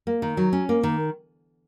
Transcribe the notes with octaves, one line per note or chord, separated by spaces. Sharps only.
A#3
D#3
F#3
C#4
A#3
D#3